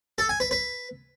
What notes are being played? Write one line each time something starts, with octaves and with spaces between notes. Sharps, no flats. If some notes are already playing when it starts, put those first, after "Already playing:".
A4
G#5
B4
B4